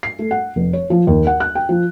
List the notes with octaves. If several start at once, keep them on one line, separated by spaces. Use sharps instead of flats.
C7
A3
F#5
F1
C#5
F3
D#2
F#5
F#6
G5
F3